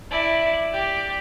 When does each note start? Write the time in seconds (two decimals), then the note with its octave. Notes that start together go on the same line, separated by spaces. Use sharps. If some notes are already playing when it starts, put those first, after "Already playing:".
0.10 E4 D5
0.73 G4 D5